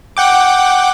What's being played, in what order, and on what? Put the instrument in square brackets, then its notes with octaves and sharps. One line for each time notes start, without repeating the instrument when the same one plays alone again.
[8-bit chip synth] F#5 G5 D6